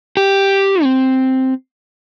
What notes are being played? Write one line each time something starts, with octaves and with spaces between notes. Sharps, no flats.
G4
C4